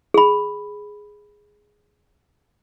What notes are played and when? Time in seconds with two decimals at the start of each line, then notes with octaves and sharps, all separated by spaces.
0.14 G#4 B5